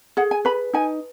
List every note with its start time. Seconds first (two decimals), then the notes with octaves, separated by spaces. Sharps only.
0.17 G#4 F#5
0.31 G#5
0.45 B4 B5
0.73 D#4 G#5